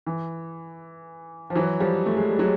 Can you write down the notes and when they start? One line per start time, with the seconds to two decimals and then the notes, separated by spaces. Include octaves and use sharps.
0.07 E3
1.50 F3
1.55 E3 F#3
1.80 F3 G3
2.06 A3
2.17 G#3
2.28 G3
2.39 F#3 G#3